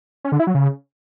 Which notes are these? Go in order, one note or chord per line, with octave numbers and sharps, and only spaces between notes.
C#4
D3
E4
F#3
C#3